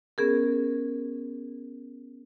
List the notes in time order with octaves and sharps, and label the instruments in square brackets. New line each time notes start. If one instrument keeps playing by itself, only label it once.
[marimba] B3 C#4 G#4 A#4